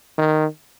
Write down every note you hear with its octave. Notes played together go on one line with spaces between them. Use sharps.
D#3